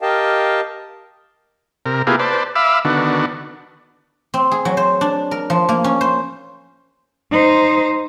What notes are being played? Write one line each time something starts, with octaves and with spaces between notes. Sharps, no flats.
G4 A#4 D#5 F5 G5 A5
C3 A#4
A#3 B3 E4 F4 G4 G#4
B4 C5 D5 A5
E5 F5 B5 D6 E6
D3 D#3 B3 D4 F#4
C4
G#4
F#3
C5
D4
A#4
F3
A#3
C#4
C5
D#4 C5